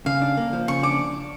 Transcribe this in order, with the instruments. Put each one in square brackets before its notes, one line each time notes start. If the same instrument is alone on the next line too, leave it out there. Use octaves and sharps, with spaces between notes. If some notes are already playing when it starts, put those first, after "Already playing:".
[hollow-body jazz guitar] C#3 [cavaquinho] F5
[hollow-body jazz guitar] D4
A#3
F3
[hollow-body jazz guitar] C#3 [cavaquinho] C#6
[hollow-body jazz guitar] D4 [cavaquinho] D6